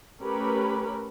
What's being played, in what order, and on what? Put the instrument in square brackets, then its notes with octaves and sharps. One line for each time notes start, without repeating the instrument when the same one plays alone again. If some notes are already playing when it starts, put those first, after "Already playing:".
[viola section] A3 C#4 G4 A#4 B4 B5